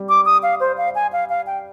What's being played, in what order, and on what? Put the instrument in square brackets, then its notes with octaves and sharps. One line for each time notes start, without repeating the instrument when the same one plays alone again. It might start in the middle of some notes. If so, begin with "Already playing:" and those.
Already playing: [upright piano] G3
[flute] D6
D#6
F5
C5
F5
G#5
F5
F5
G5